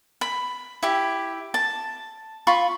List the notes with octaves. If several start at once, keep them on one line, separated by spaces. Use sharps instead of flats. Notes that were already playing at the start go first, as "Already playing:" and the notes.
B5
E4 G4
A5
F4 B5 C#6